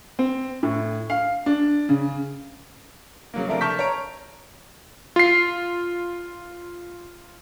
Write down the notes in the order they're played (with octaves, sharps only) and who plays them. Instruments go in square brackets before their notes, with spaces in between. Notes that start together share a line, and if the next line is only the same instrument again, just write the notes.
[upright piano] C4
A2
F5
D4
C#3
[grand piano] C#3 F#3 A#3
C3 F3 A3 D4 A#4
A5 C#6 F6 G6 B6
C#5 A#5 D7
[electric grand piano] F4 C7